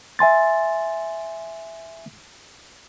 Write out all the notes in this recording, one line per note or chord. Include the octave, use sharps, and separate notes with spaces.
E5 G#5 C6 A6